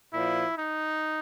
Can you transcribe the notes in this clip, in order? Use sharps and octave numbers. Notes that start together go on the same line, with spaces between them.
A#2 F3 E4
D#4